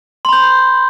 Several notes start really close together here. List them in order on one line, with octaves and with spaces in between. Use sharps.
C6 B5 G6